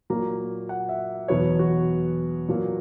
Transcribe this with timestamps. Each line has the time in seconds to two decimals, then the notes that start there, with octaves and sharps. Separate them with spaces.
0.10 A#2 F#3 A#3 A#5
0.69 F#5
0.89 E5
1.28 E2 B2 F#3 B3 C#5
1.59 F#4
2.48 A#2 F#3 A#3